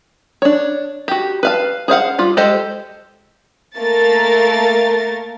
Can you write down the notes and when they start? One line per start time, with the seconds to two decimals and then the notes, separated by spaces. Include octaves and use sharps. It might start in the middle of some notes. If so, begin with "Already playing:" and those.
0.42 D4 C#5
1.08 F#4 G4
1.43 B4 F5 A5
1.88 G#4 C5 F5 F#5
2.19 G3 F4
2.37 G#3 G4 A4 C5 D#5
3.78 A3 A#3 A#4 A6